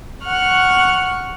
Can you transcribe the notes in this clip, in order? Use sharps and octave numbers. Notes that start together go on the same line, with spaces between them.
F#5 C#6 F6 F#6